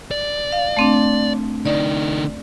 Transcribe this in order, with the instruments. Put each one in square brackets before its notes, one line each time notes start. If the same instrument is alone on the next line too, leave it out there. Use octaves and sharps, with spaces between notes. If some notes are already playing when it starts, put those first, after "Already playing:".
[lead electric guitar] D5
[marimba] F5
A3 C4 D4
[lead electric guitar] D3 D#4 [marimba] D5